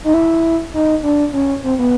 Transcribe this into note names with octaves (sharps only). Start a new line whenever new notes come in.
D#4
E4
D#4
D4
C#4
C4
B3